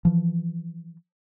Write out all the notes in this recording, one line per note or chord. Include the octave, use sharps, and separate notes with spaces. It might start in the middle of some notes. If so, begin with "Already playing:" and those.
E3 F3